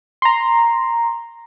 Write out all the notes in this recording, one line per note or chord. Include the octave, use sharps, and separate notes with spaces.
A#5 C6